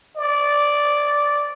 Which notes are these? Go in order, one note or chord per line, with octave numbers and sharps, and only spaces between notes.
D5